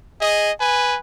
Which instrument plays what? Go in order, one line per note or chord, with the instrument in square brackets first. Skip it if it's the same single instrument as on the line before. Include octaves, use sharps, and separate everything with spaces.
[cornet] G#4 [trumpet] D#5
[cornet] B4 [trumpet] G#5